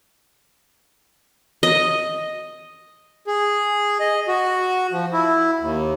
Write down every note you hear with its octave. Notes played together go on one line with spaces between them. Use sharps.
D#5
G#4
D#5
F#4
F3
E4
D#2